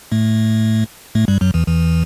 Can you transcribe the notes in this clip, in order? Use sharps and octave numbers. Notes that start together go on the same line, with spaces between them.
A2 A3
A2 A3
G2 G3
F#2 F#3
E2 E3
E2 E3